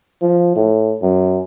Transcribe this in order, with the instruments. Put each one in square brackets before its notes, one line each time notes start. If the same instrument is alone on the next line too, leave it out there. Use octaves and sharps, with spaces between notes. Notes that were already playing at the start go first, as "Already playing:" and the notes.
[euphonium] F3
A2
F#2